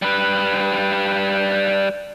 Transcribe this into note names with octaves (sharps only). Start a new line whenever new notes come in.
G3 B4